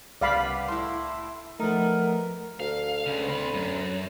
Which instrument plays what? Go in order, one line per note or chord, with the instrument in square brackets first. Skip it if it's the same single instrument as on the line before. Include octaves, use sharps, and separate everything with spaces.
[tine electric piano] C2 [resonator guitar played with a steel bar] C#3 G3 B3 [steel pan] D5 F5 B5
[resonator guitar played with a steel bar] A2 E4 [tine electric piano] C6
[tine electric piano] F3 A3 [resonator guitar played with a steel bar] B3 D#4 [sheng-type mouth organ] A#4
[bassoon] D2 [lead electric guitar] F5
[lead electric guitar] C#2 C#3
C4 B5
F#2